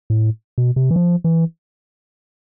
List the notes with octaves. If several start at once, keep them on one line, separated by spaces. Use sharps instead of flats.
A2
B2
C3
E3
F3
E3